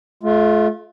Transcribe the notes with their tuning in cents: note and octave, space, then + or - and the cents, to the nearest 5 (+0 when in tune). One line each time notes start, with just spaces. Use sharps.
A3 -40 F4 +0